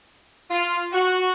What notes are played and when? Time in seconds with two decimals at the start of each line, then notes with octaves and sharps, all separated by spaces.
0.50 F4
0.92 F#4